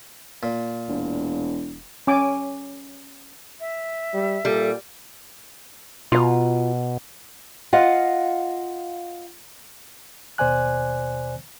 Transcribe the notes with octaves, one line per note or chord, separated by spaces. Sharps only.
A#2
E1
C#4 G#5 D6
E5
G3
A#2 G3 A4
B2 F4 A#5
F4 D#5 F5 F#5
D#2 B2 C5 D5 G#5 F#6